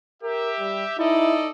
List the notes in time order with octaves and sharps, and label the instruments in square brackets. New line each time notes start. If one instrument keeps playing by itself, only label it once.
[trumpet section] G4 E5 [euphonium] A#4
[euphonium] G3
[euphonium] D#4 [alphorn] E4 [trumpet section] A4 D5 D#5